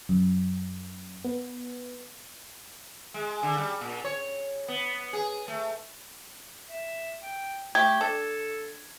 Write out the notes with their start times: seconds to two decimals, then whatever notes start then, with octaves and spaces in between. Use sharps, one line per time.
0.09 F#2
1.25 B3
3.14 G#3
3.43 D3
3.58 G3
3.81 A#2
4.04 C#5
4.68 B3
5.13 G#4
5.48 A3
6.69 E5
7.23 G5
7.75 A3 G4 G#6
8.01 D4 A4